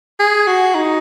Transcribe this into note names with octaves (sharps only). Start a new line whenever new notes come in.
G#4
F#4
D#4